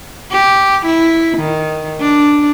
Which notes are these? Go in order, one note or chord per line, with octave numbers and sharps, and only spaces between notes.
G4
E4
D#3
D4